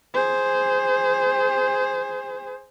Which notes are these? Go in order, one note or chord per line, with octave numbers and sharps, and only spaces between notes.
G#4 C5